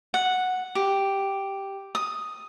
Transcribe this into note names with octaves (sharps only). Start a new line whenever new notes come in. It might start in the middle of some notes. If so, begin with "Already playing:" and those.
F#5
G4
D#6